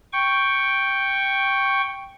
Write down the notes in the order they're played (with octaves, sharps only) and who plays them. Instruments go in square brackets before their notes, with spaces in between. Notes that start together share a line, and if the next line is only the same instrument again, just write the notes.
[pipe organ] G5 C#6